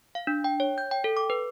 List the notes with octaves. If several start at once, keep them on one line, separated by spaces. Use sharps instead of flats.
F5
D4
G5
C#5
G6
G5
A4
D6
B4